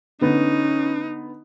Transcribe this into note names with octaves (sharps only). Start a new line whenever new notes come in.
D3 B3 C#4 D#4